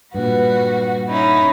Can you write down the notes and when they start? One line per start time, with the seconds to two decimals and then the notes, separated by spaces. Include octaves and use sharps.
0.14 G2 A#2 G3 F#4 B4
1.09 C#4 D#4 E4 B5